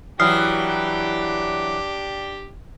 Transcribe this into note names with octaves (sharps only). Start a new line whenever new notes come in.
E3 F#3 D4 G4 G5 D#6 F6 C7